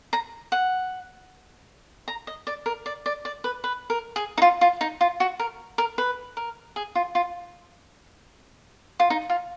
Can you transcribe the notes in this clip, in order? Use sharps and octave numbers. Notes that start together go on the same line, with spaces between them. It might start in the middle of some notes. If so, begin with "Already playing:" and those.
A#5
F#5
A#5
D#5
D5
A#4
D5
D5
D5
B4
B4
A#4
G#4
D#4
F4
F4
D#4
F4
F#4
A#4
A#4
B4
A#4
G#4
F4
F4
F4
D#4
F4